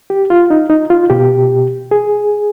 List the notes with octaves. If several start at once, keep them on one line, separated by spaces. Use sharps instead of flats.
G4
F4
D#4
D#4
F4
B2 G4
G#4